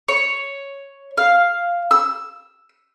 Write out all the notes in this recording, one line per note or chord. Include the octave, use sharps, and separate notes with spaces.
C#5
F5
E6